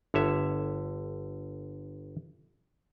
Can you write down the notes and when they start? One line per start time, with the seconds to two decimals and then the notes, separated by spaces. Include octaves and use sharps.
0.14 G1 D3 C#5 E5